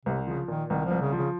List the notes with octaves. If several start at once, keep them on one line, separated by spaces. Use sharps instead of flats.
C2 C3
C#3 F3
A#2 D#3
C2 D#3
F3
C2
C#3
F3
C#3